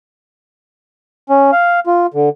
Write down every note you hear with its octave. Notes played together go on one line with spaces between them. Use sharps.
C#4
F5
F4
D3